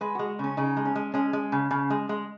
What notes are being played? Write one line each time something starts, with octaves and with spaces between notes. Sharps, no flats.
G#3 B4
G#3 F#4
C#3 C#4
C#3 D#4
G#3
C#4
G#3
G#3 C#4
G#3
C#3
C#3
G#3
G#3